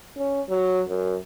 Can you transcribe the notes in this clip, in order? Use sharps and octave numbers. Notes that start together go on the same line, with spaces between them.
C#4
F#3
F#2